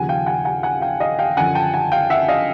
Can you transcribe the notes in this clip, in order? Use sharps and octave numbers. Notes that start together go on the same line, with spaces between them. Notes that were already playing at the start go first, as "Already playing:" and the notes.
Already playing: D#2 C#3 F3 F#5 G#5
F5 G5
F#5 G#5
F#5 G#5
F#5 G#5
F5 G5
D#5 F5
F5 G5
F#2 D3 F3 F#5 G#5
G5 A5
F#5 G#5
F5 G5
E5 F#5
D#5 F5